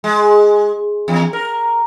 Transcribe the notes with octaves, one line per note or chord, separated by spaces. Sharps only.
G#3
E2
A#4